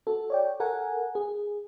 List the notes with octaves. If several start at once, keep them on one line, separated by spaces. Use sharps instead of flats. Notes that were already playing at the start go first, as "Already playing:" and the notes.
F#4 A4
C#5 D5 G5
A4 A#4 F#5 G#5
G#4